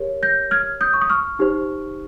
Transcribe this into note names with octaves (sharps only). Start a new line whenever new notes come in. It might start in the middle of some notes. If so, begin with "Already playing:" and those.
Already playing: G4 A#4 C#5
G6 A#6
F6 G#6
D#6 G6
C#6
D#6
C#6 F6
D#4 G4 C5